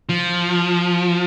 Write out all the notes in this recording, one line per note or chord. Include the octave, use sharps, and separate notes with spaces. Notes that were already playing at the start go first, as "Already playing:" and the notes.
F3